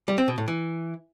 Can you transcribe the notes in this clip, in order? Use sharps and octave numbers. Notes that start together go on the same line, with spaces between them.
G3
C4
B2
A2
E3